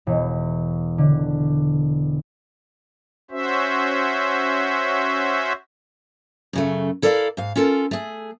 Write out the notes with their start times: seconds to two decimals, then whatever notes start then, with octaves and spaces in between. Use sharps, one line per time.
0.07 E1
0.98 D3
3.31 C#4 F#4 C5 E5
6.53 F#2 C#3 A3
7.02 E4 A4 A#4 D5 E5 F5
7.37 G#2 F5
7.56 C#4 F4 A4 A#4
7.91 A3 G#4